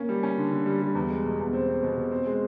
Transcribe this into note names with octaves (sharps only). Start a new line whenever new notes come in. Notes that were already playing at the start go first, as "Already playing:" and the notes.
Already playing: A#3 C#4
G3
C#4
D3
D3
G3
G3
E2
G#3
B2
E2
C4
C4
B2
B2
C4
G#3